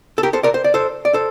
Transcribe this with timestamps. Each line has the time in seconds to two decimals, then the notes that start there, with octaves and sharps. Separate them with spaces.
0.18 A4
0.23 G4 A#4
0.33 A4 C5
0.43 A#4 D5
0.54 C5
0.64 D5
0.74 A4 C5
1.05 D5
1.14 A4 C5